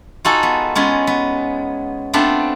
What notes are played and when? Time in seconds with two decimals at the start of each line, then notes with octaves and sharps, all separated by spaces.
0.25 D#4 F4 F#4 G#4 A4
0.43 B3
0.75 G#3 B3 C#4 F4
1.07 B3
2.13 A3 B3 C4 D4 F4